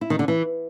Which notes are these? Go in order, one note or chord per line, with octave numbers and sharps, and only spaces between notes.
E4
D#3
D3
E3